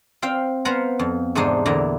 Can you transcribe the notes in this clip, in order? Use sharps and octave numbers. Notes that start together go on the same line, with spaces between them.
C4 F5 G5
B3 C5 F5 F#5 A#5
F2
E2 G#2 C3 D4 D#4 C5
E2 A#2 D3 E4 A#5